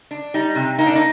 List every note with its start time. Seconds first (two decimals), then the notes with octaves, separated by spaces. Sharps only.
0.11 D4
0.34 G3 D#4
0.55 C3
0.78 A#3 D#4
0.87 D4
0.95 D#4